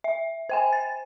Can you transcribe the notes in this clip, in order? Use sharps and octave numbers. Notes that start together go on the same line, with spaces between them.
E5
C5 G5 G#5
A6